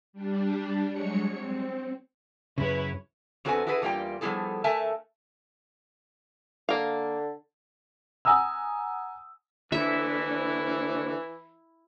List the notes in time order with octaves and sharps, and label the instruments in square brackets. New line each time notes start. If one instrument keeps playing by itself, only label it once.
[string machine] G3 D4
F#3 G#3 C#5 C#7
C4
[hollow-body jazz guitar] F#2 C#3 [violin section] E4 B4 C#5
[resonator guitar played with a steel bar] E2 C4 F#4 A4 B4 G#5
E4 F#4 G#4 A4 B4
E2 G3 A#3 D#4 F4 G5
F3 G3 B3 E4 G#4 A4
A3 A#4 E5 G#5 A5
[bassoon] D3 [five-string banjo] A#3 F5
[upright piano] F#5 G#5 A#5 D#6 E6
[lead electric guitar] D#2 D3 [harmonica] E3 [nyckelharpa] E4 [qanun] E5